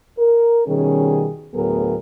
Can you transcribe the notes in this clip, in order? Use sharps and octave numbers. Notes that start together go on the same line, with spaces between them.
A#4
B2 D#3 G3 C#4 G#4
D2 A2 F#3 B3 G#4 A#4